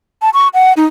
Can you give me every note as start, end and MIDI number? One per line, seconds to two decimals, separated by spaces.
0.22 0.29 81
0.34 0.48 85
0.54 0.73 78
0.77 0.85 63